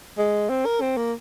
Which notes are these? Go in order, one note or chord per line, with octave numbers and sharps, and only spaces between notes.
G#3
C4
A#4
C4
A#3